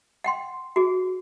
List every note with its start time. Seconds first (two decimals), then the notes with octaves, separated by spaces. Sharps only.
0.24 F#5 G5 C6
0.76 F#4 G#4